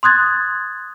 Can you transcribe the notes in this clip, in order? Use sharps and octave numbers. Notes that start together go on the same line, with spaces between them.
C6 D#6 F#6 G#6 A6